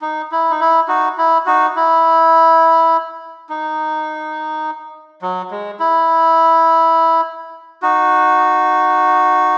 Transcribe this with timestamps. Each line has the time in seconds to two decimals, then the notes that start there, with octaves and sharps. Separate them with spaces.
0.02 D#4
0.32 E4
0.51 D#4
0.60 E4
0.88 D#4 F#4
1.18 E4
1.46 D#4 F#4
1.76 E4
3.49 D#4
5.22 F#3
5.51 G#3
5.80 E4
7.82 D#4 F#4